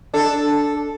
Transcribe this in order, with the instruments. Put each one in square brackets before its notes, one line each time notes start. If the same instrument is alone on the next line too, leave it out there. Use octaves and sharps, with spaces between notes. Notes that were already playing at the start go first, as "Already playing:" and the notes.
[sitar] D4 A4